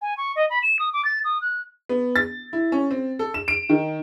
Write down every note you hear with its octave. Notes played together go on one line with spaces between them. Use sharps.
G#5
C#6
D#5
B5
E7
D#6
D6
A6
D#6
F#6
B3
A6
E4
C#4
C4
A4
E7
D7
D#3